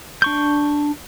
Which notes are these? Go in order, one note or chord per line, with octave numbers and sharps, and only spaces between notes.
D4 C#6 G6